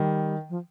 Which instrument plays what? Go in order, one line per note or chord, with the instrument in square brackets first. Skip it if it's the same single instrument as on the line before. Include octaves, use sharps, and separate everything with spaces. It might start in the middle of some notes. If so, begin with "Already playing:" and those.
Already playing: [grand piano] D#3 [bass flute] G3
[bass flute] F3